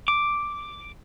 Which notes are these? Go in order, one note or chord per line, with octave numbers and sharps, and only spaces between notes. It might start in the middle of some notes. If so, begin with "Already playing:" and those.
D6